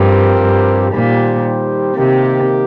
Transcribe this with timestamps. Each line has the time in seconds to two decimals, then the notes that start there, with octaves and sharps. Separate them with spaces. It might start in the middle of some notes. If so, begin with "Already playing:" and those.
Already playing: G2 F3 C4 G4 A#4
0.41 G2
0.92 A#2 D#3 G3 D#4 G4 C5
1.95 C3 D#3 A#3 G4